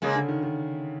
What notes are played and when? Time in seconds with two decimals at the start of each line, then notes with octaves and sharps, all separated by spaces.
0.02 C#3 G#3 A#3
0.16 D3
0.29 D#3
0.43 D#3